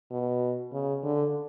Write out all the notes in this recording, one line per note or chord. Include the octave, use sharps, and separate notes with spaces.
B2
C#3
D3